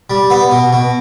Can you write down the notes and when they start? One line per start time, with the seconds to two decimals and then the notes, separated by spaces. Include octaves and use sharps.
0.10 G3
0.30 B3
0.52 B2
0.73 B2